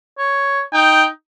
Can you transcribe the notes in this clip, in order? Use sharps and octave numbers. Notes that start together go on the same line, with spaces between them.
C#5
D#4 G5